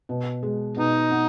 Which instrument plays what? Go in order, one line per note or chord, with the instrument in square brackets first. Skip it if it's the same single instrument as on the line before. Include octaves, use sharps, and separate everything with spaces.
[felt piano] B2
G#3
[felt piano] B2 [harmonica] D#4
[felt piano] B3